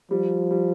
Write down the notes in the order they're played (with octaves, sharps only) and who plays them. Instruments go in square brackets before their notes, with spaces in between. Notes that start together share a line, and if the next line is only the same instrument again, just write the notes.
[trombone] F3 [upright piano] G3
[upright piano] G3